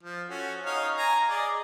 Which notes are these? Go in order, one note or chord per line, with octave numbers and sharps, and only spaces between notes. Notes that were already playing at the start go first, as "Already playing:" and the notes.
F3
C#4 F#4 A4
D#4 C#5 F5
G#5 A#5
G#4 D5 D#5